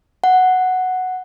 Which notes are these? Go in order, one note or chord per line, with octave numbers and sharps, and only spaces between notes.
F#5